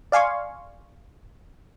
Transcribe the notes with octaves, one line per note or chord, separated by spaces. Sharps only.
D5 F5 G#5 C6 C#6